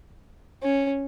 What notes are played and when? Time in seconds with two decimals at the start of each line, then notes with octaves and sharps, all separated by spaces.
0.63 C#4